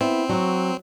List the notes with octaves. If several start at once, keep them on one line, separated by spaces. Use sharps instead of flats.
B3 C4 E4
F#3 F#4